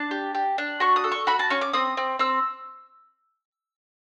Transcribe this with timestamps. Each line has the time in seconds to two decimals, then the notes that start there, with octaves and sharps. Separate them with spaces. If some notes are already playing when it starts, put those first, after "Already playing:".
Already playing: D4 A5
0.11 G4
0.35 G4
0.58 D4
0.80 F#4 C#6
0.96 D#6
1.04 A4
1.12 C#6
1.27 F#4 B5
1.39 A5
1.50 C#4 C#6
1.61 D6
1.73 C4 D#6
1.97 C4
2.19 C4 E6